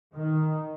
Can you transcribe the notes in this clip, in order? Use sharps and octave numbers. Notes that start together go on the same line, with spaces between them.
D#3